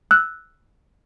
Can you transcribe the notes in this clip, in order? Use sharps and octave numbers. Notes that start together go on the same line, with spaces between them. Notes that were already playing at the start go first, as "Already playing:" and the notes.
E6 F#6